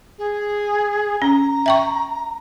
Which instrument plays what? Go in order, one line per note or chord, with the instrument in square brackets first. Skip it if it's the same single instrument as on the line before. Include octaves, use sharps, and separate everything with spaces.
[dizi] G#4
[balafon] C#4 [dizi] A#5
[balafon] E5 G5 C#6